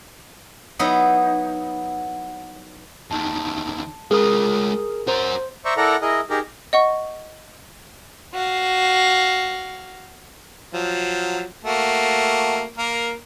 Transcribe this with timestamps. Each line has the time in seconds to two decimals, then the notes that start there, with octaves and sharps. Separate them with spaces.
0.79 F#3 B3 D#4 E4
3.11 E2 D#3 A5
4.11 G#3 F4 G#4 A#4 D#6
5.08 F#4 A#4 C5
5.65 C5 D5 E5 A#5 C#6
5.77 E4 A4 A#4 D5 F#5 A#5
6.02 E4 G#4 A#4 D#5
6.30 D#4 G4 G#4 A#4
6.73 D#5 F#5 C#6
8.34 F#4 F5
10.73 F3 F#3
11.64 A3 A#3 F#4
12.78 A#3 A#4